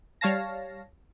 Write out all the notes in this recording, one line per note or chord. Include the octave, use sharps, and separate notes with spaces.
G3 C#5 F5 A5 A#6